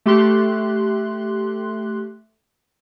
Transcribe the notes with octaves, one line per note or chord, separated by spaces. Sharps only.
A3 G4 C6 F#6